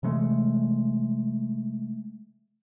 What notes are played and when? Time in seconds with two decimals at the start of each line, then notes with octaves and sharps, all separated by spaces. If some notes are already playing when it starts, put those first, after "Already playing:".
0.03 C3 E3 G#3 A3